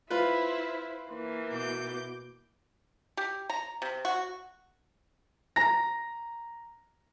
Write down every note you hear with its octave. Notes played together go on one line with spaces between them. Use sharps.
E4 F4 B4 C5
E3 A#3
B2 D6 G6
G4
A#5
C3
F#4
A#5 A#6